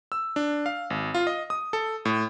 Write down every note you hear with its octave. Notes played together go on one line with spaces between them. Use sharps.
E6
D4
F5
G#1
F4
D#5
D#6
A4
A2